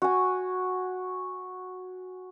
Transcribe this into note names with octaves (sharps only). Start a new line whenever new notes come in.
F#4 G#5